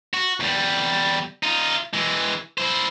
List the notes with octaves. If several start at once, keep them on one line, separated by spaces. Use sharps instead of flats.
F#4
E2 G3
D#4 F4
E3 G#3
E4 C5